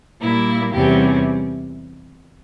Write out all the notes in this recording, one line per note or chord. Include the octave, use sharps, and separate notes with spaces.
A#2 G3 A#3 E4
E2 C3 G3 C#4 G4